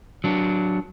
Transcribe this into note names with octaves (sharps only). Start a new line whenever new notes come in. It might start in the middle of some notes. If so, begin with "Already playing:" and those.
F#3 D4